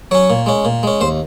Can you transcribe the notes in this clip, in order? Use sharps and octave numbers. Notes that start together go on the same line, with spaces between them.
F#3 C#4 C#5
A#2
G#3 C#4
A#2
G#3 C#4
D#2 C5